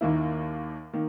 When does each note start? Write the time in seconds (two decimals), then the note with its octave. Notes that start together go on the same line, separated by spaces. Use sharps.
0.01 D#2 D#3 A#3 E4
0.93 D#3 A#3